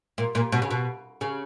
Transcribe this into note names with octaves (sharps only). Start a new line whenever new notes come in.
A#2
A#2
B2
C#3
B2
C#3